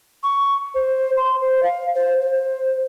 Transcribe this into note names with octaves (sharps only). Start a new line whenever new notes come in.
C#6
C5
C6
C5
F5
C5
C5